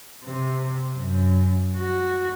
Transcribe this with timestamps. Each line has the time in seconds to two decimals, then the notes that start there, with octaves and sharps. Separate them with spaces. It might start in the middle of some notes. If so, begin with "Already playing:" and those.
0.25 C3
0.97 F#2
1.77 F#4